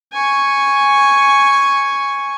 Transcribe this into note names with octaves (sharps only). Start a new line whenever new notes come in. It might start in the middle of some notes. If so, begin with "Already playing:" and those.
G#5 C#6